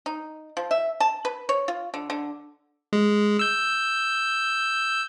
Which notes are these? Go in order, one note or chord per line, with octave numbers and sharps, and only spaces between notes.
D#4
F3
E5
A5
B4
C#5
F4
D3
D3
G#3
E6 G6